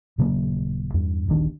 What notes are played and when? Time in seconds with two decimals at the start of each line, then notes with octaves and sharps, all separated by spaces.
0.18 D#1 C#3 F#3 A#3
0.94 E2 G2
1.28 D#1 A#1 D#3 D4